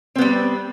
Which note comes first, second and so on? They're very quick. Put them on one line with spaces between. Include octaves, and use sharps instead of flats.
C4 B3 G3